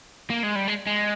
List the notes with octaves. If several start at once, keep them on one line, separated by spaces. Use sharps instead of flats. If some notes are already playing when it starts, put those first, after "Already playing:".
A#3
G#3
G3
G#3
G#3